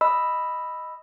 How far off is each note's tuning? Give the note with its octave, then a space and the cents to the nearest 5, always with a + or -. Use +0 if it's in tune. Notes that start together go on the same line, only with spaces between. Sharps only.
D#5 +0 B5 +0 E6 +5